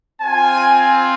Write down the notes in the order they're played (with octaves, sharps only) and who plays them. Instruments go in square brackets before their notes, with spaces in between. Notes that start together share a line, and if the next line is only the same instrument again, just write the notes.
[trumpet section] C4 F4 G#5